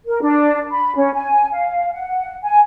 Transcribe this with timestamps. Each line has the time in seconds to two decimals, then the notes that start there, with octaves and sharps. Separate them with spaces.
0.06 A#4
0.22 D4
0.71 B5
0.96 C#4
1.14 G#5
1.52 F5
1.92 F#5
2.43 G#5